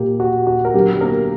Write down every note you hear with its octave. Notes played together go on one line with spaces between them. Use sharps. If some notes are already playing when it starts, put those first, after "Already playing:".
Already playing: A#2 A#3 G4
F#4
F#4
A#4
D3 F#3 B3 G4
A#3 A#4